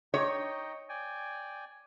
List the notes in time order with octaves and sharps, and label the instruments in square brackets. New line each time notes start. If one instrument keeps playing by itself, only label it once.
[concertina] D#4 D#5 G5 [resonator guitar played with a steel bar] C#5
[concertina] D5 G5 G#5